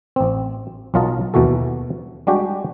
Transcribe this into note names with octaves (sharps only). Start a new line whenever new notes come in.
A1 C4
B1 F#3 F4 A#4 D#5 A5
D#2 B2 E3 F#4 A4
G3 G#3 D4 F#4 G4 G5